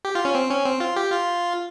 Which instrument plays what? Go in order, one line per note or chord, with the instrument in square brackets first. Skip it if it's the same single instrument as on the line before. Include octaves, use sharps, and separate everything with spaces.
[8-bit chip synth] G4
F4
C#4
C4
C#4
C4
F4
G4
F4